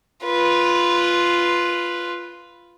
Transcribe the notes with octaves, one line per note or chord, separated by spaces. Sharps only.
F4 B4